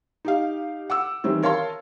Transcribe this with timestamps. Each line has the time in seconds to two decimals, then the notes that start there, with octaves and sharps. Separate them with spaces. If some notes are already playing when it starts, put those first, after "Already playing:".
0.25 D#4 G4 F5
0.90 F#5 D6 E6
1.24 D#3 E3 G3 C4 C#4
1.43 A#4 C#5 F5 A5 C6